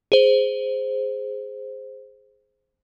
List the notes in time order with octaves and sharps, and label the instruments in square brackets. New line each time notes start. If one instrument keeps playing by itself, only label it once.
[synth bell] G#4 C5